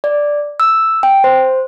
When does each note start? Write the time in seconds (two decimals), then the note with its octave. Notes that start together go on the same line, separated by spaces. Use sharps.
0.04 D5
0.60 E6
1.03 G5
1.24 C5